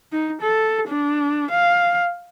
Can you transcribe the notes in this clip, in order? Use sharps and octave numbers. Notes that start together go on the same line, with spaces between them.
D#4
A4
D4
F5